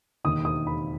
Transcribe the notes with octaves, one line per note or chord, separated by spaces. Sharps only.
E1 D#2 D#3 D#6
D#6
B5